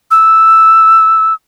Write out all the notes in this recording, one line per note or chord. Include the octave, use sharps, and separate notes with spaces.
E6